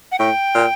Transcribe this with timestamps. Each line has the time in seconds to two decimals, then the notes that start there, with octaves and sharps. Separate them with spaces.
0.12 F#5
0.19 A2 G5
0.55 A#2